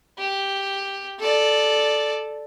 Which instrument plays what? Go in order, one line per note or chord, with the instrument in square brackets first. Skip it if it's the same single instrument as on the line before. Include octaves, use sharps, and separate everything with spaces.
[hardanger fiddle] G4
A4 D5